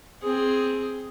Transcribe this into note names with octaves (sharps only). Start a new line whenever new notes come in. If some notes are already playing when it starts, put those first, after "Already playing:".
C4 G#4